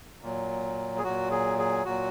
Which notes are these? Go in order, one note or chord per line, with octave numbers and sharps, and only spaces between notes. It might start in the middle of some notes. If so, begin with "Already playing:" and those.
A#2 F#3
G#4
A#2 F#3 F#4
G#4
G#4
A#2 F#3 F#4